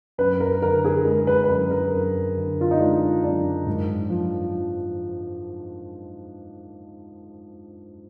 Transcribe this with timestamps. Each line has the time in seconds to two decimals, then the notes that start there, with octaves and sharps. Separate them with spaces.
0.18 F#2 B4
0.40 A#4
0.62 D3 A#4
0.84 G#4
1.05 G#3 A#4
1.27 B4
1.44 B4
1.49 F#2 A#4
1.71 A#4
1.93 F#2
2.37 D3
2.61 F4
2.71 D#4
2.79 G#3 D4
3.23 F#2 D4
3.66 G#2
4.10 F3